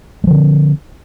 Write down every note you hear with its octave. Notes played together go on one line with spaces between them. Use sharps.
D3 F3 G#3 C4